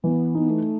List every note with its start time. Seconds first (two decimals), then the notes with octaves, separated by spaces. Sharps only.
0.04 E3 B3
0.35 B3 D#4
0.50 A3